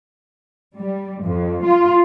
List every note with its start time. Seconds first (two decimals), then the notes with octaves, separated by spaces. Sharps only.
0.76 G3
1.22 F2
1.64 F4